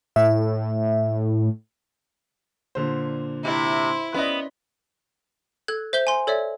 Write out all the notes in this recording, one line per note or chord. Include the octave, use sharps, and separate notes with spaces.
A2 E5
A#2 D3 C5
C3 E4
B3 C#4 D5 D#5
A4 F#6 G#6
C5 E5 G6 G7
G#5 C6
A4 C#5 D5 E5